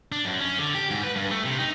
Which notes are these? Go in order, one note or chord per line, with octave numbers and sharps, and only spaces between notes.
D4
F#2
C#4
D3
G4
G#2
B4
G2
A3
C3
D#4